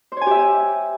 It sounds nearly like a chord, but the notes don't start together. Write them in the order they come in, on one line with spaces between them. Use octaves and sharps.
C5 C#5 G#5 G4 E5